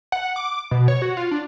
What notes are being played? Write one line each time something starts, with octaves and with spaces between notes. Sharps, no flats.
F#5
D6
B2
C#5
F#4
F4
D4